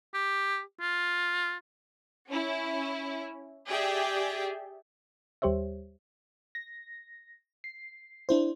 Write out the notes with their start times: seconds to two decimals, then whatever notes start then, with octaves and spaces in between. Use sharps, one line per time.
0.14 G4
0.80 F4
2.29 C#4 E4
3.68 G4 G#4 D5 E5 G5
5.42 D#2 G3 G4 C5 C#5 E5
6.55 A#6
7.64 C7
8.29 D4 E4 C5